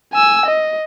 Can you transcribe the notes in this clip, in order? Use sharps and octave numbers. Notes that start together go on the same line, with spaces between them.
G#5 E6
D#5